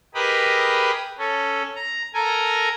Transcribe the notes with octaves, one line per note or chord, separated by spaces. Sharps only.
G4 G#4 A#4 B4 D#5 B5
C#4 A4
A#5
A4 A#4 G#5 A#5